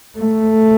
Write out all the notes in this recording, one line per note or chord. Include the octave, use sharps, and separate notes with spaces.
A3